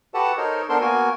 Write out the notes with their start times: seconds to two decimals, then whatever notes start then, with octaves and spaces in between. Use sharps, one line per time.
0.14 F#4 G4 A4 B4 F#5 A5
0.37 D#4 A4 A#4 C5 C#5 D#5
0.69 B3 D4 A4 A#4 C5 C6
0.81 A#3 B3 F#4 A#4 G#5